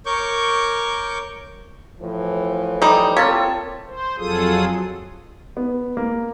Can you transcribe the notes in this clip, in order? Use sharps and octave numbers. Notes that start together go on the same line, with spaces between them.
A#4 C#5 C#6 D6 G6
A2 E3 F3
G3 D#4 A4 D#6
A#3 C4 F4 A4 C#5 F6 A6 B6
C5
F2 F#3 F4 G#4 A4 D#6
B3
A#3